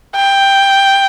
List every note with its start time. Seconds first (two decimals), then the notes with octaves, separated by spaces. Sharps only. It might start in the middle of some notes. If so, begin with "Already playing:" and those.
0.16 G5